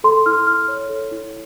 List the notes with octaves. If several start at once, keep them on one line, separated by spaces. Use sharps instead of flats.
A4 C6
E4 F6
E4 F6
C#5
A4
E4